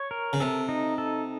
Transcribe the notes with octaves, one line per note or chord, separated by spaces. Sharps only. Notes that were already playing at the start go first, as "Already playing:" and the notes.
Already playing: C#5
A#4
C#3
C3 A4
D#4
A4